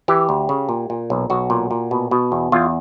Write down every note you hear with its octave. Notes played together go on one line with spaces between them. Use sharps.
E3 G4
D2
C#3
A#2
A#2
B1
B1 F#4
A#2
A#2
B2
B2
E2
E2 F4